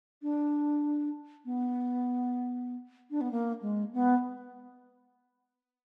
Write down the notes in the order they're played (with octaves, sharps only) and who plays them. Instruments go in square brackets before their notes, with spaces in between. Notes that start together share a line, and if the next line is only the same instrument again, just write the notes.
[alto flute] D4
B3
D4
B3
A#3
G#3
B3